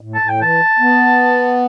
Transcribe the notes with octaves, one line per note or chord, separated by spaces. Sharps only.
A2
A5
A2
G5
E3 A5
B3